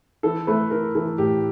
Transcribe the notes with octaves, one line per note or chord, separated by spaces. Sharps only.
E3 A4
A3 B4
E3 A#4
E3 A4
A2 G4